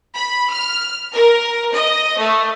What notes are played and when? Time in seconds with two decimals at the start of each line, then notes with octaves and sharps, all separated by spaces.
0.14 B5
0.49 F6
1.12 A#4
1.73 D#5
2.18 A3